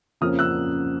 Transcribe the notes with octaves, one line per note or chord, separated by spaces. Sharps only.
F2 C#3 F3 A#3 C#4 D#6 F6
E6 F#6